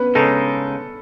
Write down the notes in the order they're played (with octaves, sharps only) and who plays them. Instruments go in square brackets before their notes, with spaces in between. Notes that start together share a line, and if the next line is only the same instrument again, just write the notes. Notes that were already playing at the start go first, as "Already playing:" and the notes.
Already playing: [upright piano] B3 C#4 B4
[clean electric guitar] C#3 G#3 D#4 [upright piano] A4